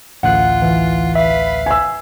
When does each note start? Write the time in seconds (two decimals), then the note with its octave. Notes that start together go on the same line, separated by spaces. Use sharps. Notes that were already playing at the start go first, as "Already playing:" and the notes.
0.23 A1 D2 F4 F#5 F#6
0.62 E3
1.15 B4 E5 F5
1.66 G#5 E6